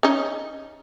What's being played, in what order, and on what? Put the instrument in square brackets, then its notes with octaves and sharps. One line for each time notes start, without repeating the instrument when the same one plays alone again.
[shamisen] C#4 D#4